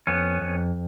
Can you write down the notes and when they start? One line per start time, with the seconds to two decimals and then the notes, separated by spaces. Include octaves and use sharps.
0.07 F2 B3 C#4
0.41 F2